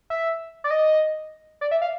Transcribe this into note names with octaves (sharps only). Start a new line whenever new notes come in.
E5
D5
D#5
D5
E5
F5